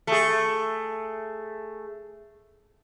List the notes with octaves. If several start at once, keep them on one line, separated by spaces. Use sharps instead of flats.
A3 G#4